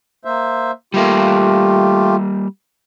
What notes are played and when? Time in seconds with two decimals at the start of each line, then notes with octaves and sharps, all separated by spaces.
0.25 A#3 C5 E5
0.94 G3 A3 A#3 F4 G4